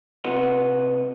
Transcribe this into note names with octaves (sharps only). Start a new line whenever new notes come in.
C2 C3 F4 B4 F#5 C6